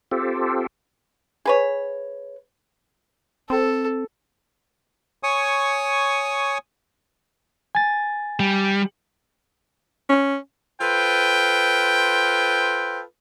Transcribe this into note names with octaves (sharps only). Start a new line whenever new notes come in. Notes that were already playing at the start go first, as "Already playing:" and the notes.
C4 F4 G4 A4
G#4 B4 C#5
C4 A4
C#5 G#5 C#6 D#6
G#5 A6
G3
C#4
F4 A4 B4 C5 G5